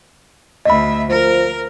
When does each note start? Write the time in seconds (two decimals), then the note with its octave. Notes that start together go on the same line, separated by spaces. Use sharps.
0.65 D2 D#5 E5 B5
1.10 F3 A#4